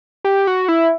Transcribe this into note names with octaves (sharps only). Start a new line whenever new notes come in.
G4
F#4
E4